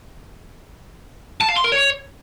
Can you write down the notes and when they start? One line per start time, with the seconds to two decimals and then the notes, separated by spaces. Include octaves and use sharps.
1.41 A5
1.49 F5
1.56 C6
1.64 A#4
1.72 C#5